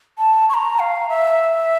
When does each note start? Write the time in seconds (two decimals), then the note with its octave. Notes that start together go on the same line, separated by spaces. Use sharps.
0.18 A5
0.49 C#6
0.54 A#5
0.79 F5
1.09 E5